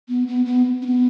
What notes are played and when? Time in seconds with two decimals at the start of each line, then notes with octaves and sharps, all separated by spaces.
0.09 B3
0.28 B3
0.46 B3
0.82 C4
0.86 B3